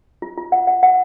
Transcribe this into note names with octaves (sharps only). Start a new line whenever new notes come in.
F4
F4
F#5
F#5
F#5